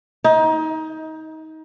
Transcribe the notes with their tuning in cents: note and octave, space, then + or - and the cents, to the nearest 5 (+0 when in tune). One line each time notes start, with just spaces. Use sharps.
D#4 +25